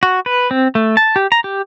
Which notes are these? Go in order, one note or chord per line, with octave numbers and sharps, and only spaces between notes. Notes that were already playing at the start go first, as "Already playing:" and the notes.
F#4
B4
C4
A3
A5
G4
A#5
G4